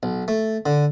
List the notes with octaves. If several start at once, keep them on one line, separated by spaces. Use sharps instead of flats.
B1
A3
D3